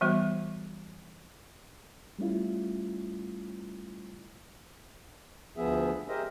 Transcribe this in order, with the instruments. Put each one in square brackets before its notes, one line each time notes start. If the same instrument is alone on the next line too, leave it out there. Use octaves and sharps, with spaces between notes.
[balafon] E3 G3 B3 F#4 C5
[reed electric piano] G3 A3 C#4 E4 F4
[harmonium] D2 F3 B3 G#4 E5
G4 G#4 A#4 C5 D#5 E5